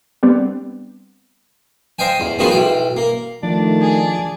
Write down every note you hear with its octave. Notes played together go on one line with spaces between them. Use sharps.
G3 B3 C4 D4
C5 D#5 F5 G5 G#5
E2
D#3 F3 B3 F4 F#4 G#4
B1 E3 G5
A#3
D#3 F3 A3 D4
G#4